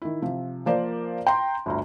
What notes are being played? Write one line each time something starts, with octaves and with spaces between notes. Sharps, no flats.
D#3 E4
C3 F3
F3 A#3 A#4 C5 D5
G5 A#5 C6
G1 D2 A#5